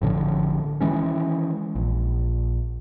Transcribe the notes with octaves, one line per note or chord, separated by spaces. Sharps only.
A1 A2 D3 F3
D#3 E3 G#3 C#4
A#1